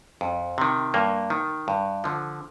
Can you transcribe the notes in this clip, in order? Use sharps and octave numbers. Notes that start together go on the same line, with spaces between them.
F2
C3 D#3
G2 A#3
D#3
G2
D3 F3